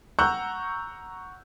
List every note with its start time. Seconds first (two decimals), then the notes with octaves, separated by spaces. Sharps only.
0.19 F#5 A#5 C#6 E6 F#6 G6